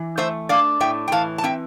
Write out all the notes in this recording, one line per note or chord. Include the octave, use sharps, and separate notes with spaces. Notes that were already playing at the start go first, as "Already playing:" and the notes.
Already playing: E3
A3 C5 E5
D4 D5 F5
A2 E5 G5
G5
E3 F5 A5
A5
C4 E5 G5